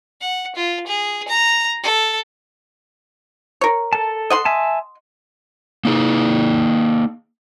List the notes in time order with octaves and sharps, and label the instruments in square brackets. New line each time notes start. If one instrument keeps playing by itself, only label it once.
[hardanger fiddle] F#5
F4
G#4
A#5
A4
[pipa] A#4 C#5
[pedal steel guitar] A4 A5
[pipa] D#5 F#5 C6
[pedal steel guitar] E5 G#5 A5
[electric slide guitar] A#3 D#4 G#4